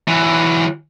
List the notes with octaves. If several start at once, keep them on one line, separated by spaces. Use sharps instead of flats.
E3 F#3